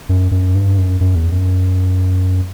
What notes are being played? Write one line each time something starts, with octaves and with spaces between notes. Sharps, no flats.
F#2
F#2
G2
F#2
F#2
E2
F#2